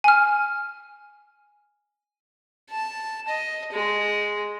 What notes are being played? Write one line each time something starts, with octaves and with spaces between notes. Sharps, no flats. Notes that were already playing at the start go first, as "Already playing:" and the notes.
G#5 F6
A5
D#5
G#3